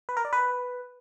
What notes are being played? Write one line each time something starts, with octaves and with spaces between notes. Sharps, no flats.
B4
A#4
D5
B4